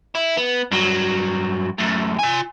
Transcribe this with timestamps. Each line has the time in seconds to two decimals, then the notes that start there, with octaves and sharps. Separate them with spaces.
0.15 E4
0.37 B3
0.71 G2 F#3
1.78 F#2 A2
2.19 F4 G#5